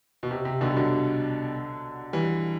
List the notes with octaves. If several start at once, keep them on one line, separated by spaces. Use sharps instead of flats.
B2
C3
C3
B2 D3
G3
D3 F#3
E3 G3